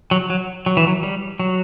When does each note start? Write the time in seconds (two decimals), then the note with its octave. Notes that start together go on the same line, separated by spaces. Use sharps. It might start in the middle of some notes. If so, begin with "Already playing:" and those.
0.11 F#3
0.30 F#3
0.66 F#3
0.77 E3
0.87 F#3
1.03 G3
1.40 F#3